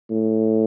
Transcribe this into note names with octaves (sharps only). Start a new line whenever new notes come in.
A2